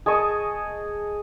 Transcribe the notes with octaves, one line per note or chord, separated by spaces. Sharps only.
G#4 D#5 A5 C#6